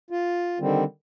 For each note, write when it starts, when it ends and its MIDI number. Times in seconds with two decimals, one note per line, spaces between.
0.10 0.58 65
0.60 0.84 50
0.60 0.84 51
0.60 0.84 55
0.60 0.84 60